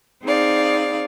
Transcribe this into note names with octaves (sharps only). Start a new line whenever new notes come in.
C4 D#4 G#4 D5 F5